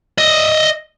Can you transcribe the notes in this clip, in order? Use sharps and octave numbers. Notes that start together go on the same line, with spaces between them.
D#5 E5